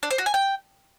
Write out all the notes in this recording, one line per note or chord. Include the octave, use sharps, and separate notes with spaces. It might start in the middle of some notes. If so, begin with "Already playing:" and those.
D4
C5
F#4
G#5
G5